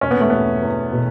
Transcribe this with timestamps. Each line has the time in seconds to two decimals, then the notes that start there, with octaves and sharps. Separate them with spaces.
0.01 E1 C#4
0.11 B3
0.20 A3
0.30 E1 B3
0.63 E2
0.92 B2